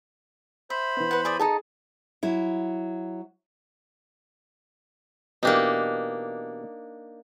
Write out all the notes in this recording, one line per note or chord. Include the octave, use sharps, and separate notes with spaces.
C5 E5 B5
E3 B3
B4 F#5
G#4 D5 D#6
D#4 G#4 A4 A5
F#3 E4
B2 E3 A#3 D4 D#4 G4